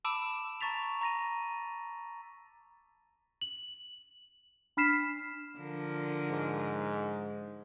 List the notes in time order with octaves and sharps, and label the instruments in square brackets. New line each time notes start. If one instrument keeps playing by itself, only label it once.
[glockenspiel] A5 B5 D6 E6 D7 E7
A5 A#5 C#6 A6 B6 F7
A#5 A#6 D#7
[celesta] F#7
D4 B5 F6 B6 C7 E7
[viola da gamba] D3 F3 A#4
[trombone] G#2